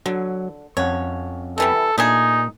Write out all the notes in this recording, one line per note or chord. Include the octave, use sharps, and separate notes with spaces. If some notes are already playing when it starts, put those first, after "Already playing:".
D3 F#3
F2 C#4 C#5 F#5
C3 E3 G3 A4
A#2 A3 D4 D#4 G#4